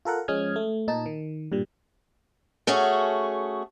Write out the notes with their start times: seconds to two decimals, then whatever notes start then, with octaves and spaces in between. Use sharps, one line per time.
0.05 F4 A4 A#4 F#5
0.28 F3 G#3 C#4 D#6 F6 G#6
0.56 A3
0.88 A#2 D#4 A5
1.06 D#3
1.52 G2 A#2 G3
2.67 A3 C#4 F#4 G#4